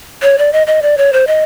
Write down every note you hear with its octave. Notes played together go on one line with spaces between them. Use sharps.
C#5
D5
D#5
D#5
D5
C#5
C5
D#5